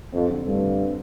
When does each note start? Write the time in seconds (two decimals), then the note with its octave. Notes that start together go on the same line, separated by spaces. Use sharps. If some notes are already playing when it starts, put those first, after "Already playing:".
0.12 F2 C4
0.29 D3
0.45 G2 A3
0.62 D2
0.79 C4